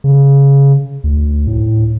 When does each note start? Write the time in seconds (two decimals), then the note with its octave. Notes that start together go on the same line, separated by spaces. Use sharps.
0.04 C#3
1.04 D2
1.47 A2